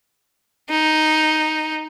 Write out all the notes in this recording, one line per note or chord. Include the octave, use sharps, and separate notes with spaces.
D#4